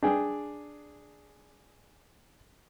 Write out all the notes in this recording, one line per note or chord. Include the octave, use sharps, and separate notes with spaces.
D4 G#4 G5